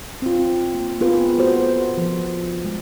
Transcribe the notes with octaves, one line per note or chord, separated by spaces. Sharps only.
C4 F4
A#3
B3 C4 F4 G#4 A#4 B4
B3 F#4 A4 C5
F3
G#3